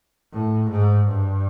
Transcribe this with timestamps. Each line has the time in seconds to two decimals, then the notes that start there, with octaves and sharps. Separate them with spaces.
0.33 A2
0.71 G#2
1.09 G2